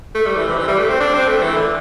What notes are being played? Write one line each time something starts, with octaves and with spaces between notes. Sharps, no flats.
A3
G3
E3
C3
E3
G3
A3
C4
D4
C4
A3
E3
D3